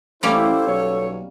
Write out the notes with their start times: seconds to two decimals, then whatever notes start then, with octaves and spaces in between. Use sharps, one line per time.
0.23 A1 G3 A#3 C#4 E4 A4 C5
0.67 B1 C#5